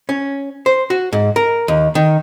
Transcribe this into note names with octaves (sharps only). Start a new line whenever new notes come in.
C#4
C5
F#4
G#2
A#4
D#2
D#3